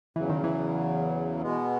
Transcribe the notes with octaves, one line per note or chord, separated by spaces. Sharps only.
E2 C#3 E3 F#3
D#3
E3
B2 G#3 B3